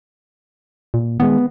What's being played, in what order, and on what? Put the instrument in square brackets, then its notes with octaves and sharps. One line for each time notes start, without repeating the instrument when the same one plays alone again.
[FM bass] A#2
[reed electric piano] D#3 G#3 [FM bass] B3